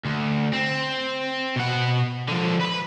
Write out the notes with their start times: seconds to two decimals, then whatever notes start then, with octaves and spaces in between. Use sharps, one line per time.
0.05 D2
0.53 C4
1.56 B2 F#5
2.28 D3 F3
2.60 B4 B5